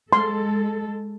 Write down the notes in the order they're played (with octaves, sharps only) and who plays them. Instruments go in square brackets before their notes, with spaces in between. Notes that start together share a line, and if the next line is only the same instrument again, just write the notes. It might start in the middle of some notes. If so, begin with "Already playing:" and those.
[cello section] G#3 A4 [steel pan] C6